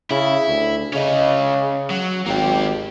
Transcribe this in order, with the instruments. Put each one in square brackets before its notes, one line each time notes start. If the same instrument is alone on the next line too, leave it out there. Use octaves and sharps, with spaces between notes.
[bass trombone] C#3 [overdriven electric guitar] E4
[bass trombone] D2
[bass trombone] C#3 [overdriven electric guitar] C#4 D#5
[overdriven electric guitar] F#3
[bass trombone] G#1 [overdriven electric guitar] A#3 G4